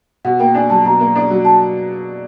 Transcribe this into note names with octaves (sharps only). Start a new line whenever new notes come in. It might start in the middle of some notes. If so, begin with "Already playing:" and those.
B2 F#5
A#3 G5
D4 G#5
F#3 A5
B2 A#5
A#3
D4
F#3
A5